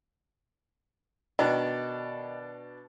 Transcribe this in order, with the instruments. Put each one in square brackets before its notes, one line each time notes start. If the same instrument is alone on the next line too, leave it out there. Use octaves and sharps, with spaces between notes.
[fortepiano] B2 D4 [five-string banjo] D#3